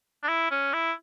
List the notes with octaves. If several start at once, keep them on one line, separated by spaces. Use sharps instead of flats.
D4
E4
C#4
E4